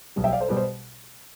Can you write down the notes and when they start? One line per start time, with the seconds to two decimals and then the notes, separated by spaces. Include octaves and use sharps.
0.16 B1 B2 G3
0.24 E5 G5
0.33 D5 F5
0.40 A4 C5
0.48 B2 G3 G4 B4
0.57 C5